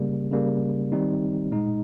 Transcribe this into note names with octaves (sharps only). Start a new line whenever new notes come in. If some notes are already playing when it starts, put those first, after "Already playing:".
Already playing: C#3 G3 A#3
C#3 G3 A#3
D#3 G3 C4 D#4
A#2 G#3 D#4